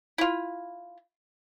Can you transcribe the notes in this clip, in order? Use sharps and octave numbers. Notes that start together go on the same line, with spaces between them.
E4 F4